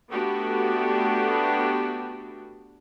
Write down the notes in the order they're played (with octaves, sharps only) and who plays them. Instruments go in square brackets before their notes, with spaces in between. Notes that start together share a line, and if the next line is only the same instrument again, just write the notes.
[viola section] A3 B3 D4 F#4 G4 A4